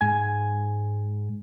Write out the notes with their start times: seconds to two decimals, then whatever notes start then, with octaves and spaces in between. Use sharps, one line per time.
0.01 G#2 G#5